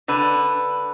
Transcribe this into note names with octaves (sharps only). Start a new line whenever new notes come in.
D3 B4